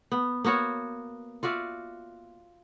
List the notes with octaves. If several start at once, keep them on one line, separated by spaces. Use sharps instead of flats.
B3
A#3 B3 F#4 C#5
F4 F#4 D5 E5